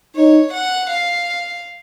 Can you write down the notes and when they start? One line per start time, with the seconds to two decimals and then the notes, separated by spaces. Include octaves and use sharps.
0.16 D#4 C#5
0.53 F#5
0.90 F5